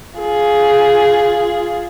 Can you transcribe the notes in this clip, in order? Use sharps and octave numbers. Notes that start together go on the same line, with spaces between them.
F4 G#4